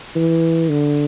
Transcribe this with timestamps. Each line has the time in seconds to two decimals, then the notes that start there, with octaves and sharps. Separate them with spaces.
0.16 E3
0.69 D3